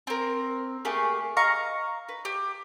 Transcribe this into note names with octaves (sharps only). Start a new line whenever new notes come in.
C4 A#4
A3 A#3 G4 G#4
D#5 F5 A#5 C#6
B4
G4